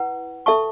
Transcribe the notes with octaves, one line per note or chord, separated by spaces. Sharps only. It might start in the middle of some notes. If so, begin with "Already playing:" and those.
Already playing: E4 B4 F#5
A4 E5 A5 C#6